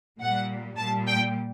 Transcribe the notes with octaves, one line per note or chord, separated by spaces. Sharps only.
A#2 G3 F#5
A#2 G3 A5
G5